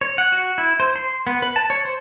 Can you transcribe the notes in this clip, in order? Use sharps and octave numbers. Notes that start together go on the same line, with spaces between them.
C#5
F#5
F#4
E4
C5
C6
B3
B4
A5
C#5
C5